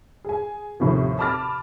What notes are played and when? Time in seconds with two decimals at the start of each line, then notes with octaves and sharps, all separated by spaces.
0.25 G#4 G#5
0.80 D#2 A2 C3 F3
1.19 A5 B5 D6 F6 A6